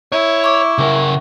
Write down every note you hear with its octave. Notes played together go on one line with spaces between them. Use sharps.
E4 C#5
C#6 D6
C#3 A#4 C#6